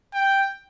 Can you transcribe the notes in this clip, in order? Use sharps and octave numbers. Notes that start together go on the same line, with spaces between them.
G5